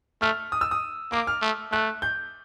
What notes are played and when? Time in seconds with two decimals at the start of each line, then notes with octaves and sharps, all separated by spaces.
0.22 A3 F6
0.52 D#6
0.61 E6
0.71 D#6
1.12 A#3 D6
1.27 F6
1.42 A3
1.72 A3 F#6
2.02 G6